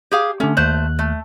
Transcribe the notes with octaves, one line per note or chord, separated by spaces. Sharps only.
G4 G#4 F5
D3 A3 C#4
D#2 A3 C5 F#6
A3